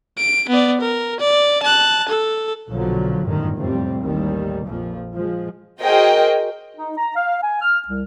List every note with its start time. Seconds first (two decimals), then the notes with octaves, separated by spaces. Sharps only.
0.18 D7
0.49 B3 D5
0.81 A#4
1.20 D5
1.63 A5 F#6
2.09 A4
2.69 B1 A#2 D3 F3 F#3
3.24 G1 F#2 A2 D3 D#3
3.57 F2 A2 C3 G3 C4
4.01 A1 D#2 D#3 G3
4.65 A#1 F2 A#2 F3
5.16 F3 G#3
5.79 F#4 G#4 A#4 C5 D#5 G5
6.77 D#4
6.97 A#5
7.16 F5
7.42 G#5
7.62 F6
7.88 C2